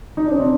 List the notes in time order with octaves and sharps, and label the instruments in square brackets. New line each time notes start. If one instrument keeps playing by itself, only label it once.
[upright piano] D#4
D4
C#4
C4 D4